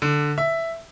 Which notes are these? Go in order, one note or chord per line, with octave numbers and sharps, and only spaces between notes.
D3
E5